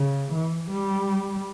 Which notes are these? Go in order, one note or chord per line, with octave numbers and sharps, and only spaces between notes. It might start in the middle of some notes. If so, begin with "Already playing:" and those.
Already playing: C#3
E3
G3